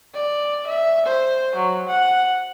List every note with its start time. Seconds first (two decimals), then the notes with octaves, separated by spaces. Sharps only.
0.14 D5
0.67 E5
1.06 C5
1.55 F#3
1.88 F#5